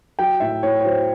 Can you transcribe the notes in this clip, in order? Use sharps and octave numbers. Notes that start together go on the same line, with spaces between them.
F#3 G5
A2 E5
A2 C#5
C#5
F#3 C5